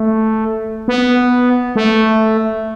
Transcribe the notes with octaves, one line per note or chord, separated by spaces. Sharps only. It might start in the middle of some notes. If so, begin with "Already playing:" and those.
Already playing: A3
B3
A3